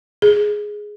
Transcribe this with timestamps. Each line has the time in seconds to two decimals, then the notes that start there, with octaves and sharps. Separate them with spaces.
0.22 G#4